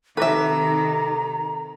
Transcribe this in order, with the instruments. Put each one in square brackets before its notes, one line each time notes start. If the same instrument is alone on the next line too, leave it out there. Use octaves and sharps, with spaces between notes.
[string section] C3 D#3 [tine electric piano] A4 D6 [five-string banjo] B4 E5 [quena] A#5